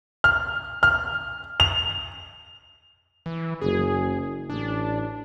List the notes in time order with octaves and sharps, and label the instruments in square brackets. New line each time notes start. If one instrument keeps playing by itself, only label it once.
[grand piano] F6
F6
F7
[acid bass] E3
[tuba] F#1 [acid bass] G#4
[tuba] A1 [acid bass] D4